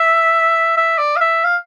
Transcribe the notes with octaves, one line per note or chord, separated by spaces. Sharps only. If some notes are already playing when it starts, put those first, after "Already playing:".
Already playing: E5
E5
D5
F5
E5
F5